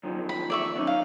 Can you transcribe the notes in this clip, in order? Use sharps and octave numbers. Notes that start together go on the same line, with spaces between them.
F#2 D#3 F3
B5
D5 E5 C#6
B3 C#4 D#4
F5